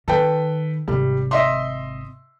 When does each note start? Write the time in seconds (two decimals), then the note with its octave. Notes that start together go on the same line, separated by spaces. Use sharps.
0.08 D#3 A4 B4 G5
0.88 G#1 C3 G3
1.31 D#5 E5 C6